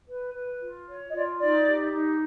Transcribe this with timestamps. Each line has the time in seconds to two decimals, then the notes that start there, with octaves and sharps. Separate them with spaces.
0.09 B4
0.35 B4
0.61 F4
0.88 C#5
1.09 D#5
1.14 F4 D5
1.40 D#4 D5
1.67 G4
1.93 D#4